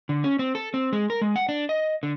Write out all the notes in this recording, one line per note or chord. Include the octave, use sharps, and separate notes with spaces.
D3
C#4
C4
A4
C4
G#3
A#4
G#3
F#5
D4
D#5
D3